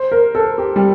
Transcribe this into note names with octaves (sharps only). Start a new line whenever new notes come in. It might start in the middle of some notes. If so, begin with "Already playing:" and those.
Already playing: C5
A#4
A4
G4
G3